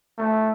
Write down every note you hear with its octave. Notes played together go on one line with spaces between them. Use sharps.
A3